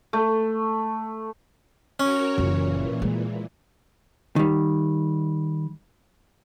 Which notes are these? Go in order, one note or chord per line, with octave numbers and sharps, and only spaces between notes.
A3
C#4 F#4 A#4 C#5
F#1 A#2 E3
G#3
D#3 G3